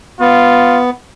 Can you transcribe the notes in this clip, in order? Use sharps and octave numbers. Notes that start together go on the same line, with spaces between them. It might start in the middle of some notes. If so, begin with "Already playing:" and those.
B3 F4